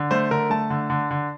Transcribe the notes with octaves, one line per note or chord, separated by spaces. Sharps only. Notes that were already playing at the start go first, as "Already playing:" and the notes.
Already playing: D3
A3 C5
D3 A#4
A3 A5
D3
D3
D3